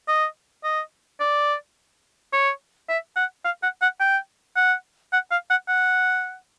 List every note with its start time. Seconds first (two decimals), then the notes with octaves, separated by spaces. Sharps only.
0.08 D#5
0.64 D#5
1.20 D5
2.33 C#5
2.89 E5
3.16 F#5
3.45 F5
3.63 F#5
3.82 F#5
4.00 G5
4.56 F#5
5.13 F#5
5.31 F5
5.50 F#5
5.68 F#5